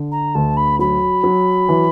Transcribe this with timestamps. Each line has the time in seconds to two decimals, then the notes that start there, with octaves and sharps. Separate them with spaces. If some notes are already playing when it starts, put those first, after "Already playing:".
Already playing: D3
0.11 A#5
0.34 D2 A5
0.57 B5
0.79 F#3 B5
1.24 F#3
1.69 E3